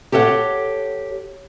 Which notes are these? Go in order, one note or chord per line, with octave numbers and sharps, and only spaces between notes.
G4 A4 C#5 E5 F#5